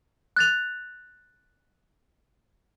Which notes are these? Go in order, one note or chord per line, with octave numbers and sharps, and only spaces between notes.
F#6 A6 F7